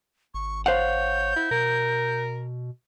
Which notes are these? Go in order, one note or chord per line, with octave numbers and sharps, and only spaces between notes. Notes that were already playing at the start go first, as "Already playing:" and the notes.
G#1 C#6
C5 C#5 F5 F#5 G6
E4
B2 A#4